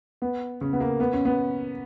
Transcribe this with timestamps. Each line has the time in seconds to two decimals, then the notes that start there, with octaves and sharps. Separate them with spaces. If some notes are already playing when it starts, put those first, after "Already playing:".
0.22 B3
0.61 C#3
0.73 B3
0.80 A#3
1.00 B3
1.13 C#4
1.25 B3